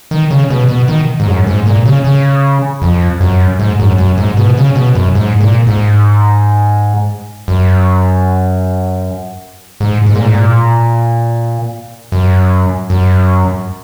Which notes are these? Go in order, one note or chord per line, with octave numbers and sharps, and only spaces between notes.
D#3
C#3
B2
B2
D#3
G#2
F#2
G#2
A#2
C#3
C#3
F2
F#2
G#2
F#2
F#2
G#2
B2
C#3
B2
F#2
G#2
A#2
G#2
F#2
G#2
G#2
A#2
G#2
A#2
F#2
F#2